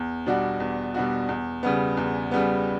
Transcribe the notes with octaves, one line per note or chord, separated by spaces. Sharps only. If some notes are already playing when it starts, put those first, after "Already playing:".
Already playing: E2
B2 G3 D4 F#4
E2
B2 G3 D4 F#4
E2
C#3 G3 B3
E2
C#3 G3 B3